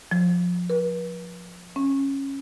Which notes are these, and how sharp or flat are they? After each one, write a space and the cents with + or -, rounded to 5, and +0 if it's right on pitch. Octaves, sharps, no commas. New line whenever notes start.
F3 +25
B4 -40
C#4 -15